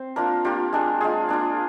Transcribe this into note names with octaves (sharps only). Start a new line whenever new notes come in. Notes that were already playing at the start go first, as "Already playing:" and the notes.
Already playing: C4 C5
A#3 D4 F4 A#4
A#3 D4 F4 G4
G#3 D4 F4
G#3 D4 F4 G#4
A#3 D4 F4